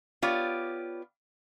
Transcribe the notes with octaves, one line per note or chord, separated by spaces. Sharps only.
B3 F4 G4 C#5 D5